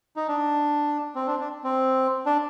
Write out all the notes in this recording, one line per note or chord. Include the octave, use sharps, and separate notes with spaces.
D#4
D4
C4
D4
D4
C4
D4